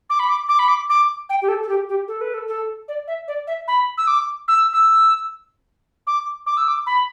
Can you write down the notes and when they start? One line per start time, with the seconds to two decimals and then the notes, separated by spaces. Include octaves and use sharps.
0.10 D6
0.19 B5
0.29 D6
0.49 D6
0.59 B5
0.68 D6
0.90 D6
1.29 G5
1.42 G4
1.48 A4
1.63 A4
1.69 G4
1.89 G4
2.08 A4
2.21 B4
2.34 A4
2.48 A4
2.88 D5
3.07 E5
3.28 D5
3.47 E5
3.68 B5
3.98 E6
4.07 D6
4.48 E6
4.73 E6
6.07 D6
6.46 D6
6.57 E6
6.68 D6
6.86 B5